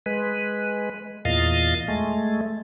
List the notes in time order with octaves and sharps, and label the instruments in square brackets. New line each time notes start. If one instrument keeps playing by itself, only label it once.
[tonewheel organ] G#3 B4
E2 A#2 D#5 F5 A6
G#3 A3